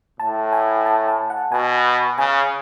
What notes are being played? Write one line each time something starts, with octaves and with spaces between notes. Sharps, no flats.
A2 A5
G#5
A5
A5
F#5
B2 G#5
C#3 G#5